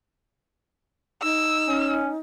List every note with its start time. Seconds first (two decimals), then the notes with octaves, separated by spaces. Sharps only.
1.23 D#4 E6
1.68 C#4